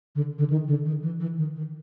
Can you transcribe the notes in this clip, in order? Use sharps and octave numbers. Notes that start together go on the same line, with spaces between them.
D3
D3
D#3
D3
D#3
E3
E3
D#3
D#3